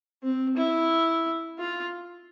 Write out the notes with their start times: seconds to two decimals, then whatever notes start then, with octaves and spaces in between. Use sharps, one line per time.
0.23 C4
0.57 E4
1.59 F4